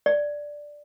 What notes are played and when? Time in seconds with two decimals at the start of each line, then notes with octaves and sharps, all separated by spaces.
0.06 D5